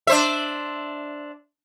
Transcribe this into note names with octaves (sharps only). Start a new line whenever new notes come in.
D4 C5 E5